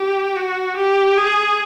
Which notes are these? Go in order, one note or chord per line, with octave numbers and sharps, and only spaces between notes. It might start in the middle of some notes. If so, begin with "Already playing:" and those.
Already playing: G4
F#4
G4
G#4